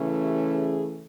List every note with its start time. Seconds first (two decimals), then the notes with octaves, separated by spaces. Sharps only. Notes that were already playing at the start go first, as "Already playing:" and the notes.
Already playing: C#3 E3 A3 C#4
0.21 G4
0.51 G#4